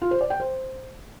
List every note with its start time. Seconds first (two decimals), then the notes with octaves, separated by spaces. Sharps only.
0.02 F4
0.11 C5
0.21 D5
0.30 G5
0.40 C5